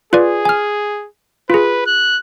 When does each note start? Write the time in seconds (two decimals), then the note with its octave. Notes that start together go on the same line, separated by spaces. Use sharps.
0.13 F4 G#4 B4 D5
0.45 G#5 F6
1.50 F4 G#4 B4
1.86 F#6